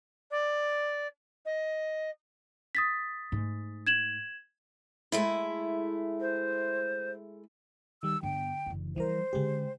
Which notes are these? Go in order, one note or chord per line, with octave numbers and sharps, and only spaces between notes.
D5
D#5
D#6 A6 B6
G#2 A3
G#6 E7 F#7
G#3 A3 E4
C5
D#3 G3 E6
G2 D3 B3 G5
F#1 E3
E3 F3 G3 A#4 C5
D3 G#3 C#4 G4